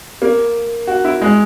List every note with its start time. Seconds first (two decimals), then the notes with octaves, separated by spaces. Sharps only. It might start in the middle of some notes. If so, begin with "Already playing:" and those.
0.22 A#3
0.87 F#4
1.05 E4
1.22 G#3